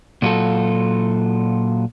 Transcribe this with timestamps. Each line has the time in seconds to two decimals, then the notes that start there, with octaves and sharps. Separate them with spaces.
0.22 A#2 F#3 F4 F#4 A4